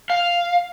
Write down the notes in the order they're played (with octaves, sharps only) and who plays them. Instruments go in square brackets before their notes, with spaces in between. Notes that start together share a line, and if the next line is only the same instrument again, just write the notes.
[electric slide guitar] F5